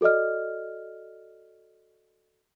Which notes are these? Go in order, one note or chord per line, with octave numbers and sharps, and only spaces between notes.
F#4 A4 D5 D#5 F6